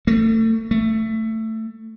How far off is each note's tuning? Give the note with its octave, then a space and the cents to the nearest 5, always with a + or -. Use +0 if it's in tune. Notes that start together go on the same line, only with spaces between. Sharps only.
A3 +30
A3 +15